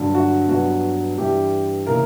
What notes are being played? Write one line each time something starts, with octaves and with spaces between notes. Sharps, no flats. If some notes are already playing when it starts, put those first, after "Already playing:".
Already playing: G2 D3 F#3
F#4
G2 F#3 B3 F#4
G2 E3 G3 G4
C#3 E3 A#3 A#4